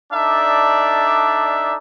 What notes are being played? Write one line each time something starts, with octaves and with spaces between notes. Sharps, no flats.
D4 D#4 A4 D5 E5